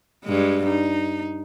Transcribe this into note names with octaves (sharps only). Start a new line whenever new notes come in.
G2 G#3
D#4